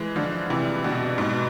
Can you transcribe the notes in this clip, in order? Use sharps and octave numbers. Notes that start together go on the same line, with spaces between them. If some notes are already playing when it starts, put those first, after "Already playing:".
Already playing: E3 G#3
D3 F3
C3 E3
B2 D3
G#2 B2